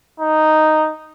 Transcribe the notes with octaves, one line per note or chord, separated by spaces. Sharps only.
D#4